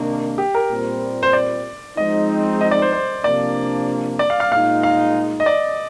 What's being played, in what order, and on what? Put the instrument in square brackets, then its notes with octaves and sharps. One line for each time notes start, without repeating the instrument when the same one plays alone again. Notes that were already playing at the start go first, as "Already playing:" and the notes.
Already playing: [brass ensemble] C3 D#3 A#3 D4
[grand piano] G4
A#4
[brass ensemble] A#2 G3 C4
[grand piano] C5
D5
[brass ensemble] F3 G#3 C4 D#4 [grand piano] D#5
[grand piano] D#5
D5
C5
C5
[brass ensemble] C3 F3 A#3 D4 [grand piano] D5
[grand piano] D5
F5
F5
[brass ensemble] A#2 G#3 D#4 [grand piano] F5
[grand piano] F5
D#5
D5